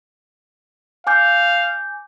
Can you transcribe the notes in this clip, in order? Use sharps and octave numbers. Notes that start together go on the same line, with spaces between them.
F5 G#5 D6 G6